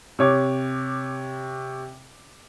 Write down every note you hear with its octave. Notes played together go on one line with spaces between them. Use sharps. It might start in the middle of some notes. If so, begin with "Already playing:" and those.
C3 C#5 D6